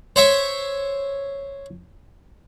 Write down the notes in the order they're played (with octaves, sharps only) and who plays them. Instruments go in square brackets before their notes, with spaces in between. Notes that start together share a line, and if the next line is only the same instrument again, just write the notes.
[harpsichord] C5 C#5 E5